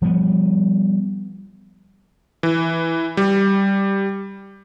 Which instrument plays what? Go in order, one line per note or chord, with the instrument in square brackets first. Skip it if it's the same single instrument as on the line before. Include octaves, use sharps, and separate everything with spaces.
[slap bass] F3 G3 A#3 B3
[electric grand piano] E3
G3